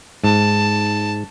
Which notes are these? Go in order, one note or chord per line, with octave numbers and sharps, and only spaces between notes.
G#2 A5